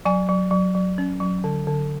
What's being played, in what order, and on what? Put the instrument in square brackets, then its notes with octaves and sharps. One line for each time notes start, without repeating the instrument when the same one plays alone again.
[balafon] F#3 G#5
F#3
F#3
F#3
C#4
F#3
D3
D3